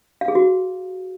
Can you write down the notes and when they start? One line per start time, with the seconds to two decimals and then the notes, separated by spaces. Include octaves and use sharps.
0.21 F5
0.28 G#4
0.35 F#4